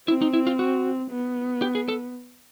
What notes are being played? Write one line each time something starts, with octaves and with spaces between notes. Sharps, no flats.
C4 E4
D#4
E4
F4
F#4
B3
G4
G#4
A4